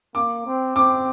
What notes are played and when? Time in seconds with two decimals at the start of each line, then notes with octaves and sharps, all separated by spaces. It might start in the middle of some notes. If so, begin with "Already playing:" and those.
0.15 A#3 D6
0.46 C4
0.76 C4 D6